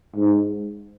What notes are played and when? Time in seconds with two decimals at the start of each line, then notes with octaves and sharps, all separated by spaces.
0.16 G#2